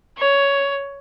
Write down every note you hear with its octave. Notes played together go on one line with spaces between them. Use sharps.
C#5